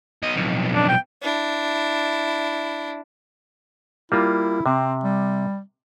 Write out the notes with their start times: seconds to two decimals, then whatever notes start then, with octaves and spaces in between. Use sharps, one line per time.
0.22 B1 D#5
0.36 B1 F2
0.75 D4
0.89 G5
1.23 D4 E4
4.12 G3 A#3 E4 F4
4.66 C3 C4
5.04 G3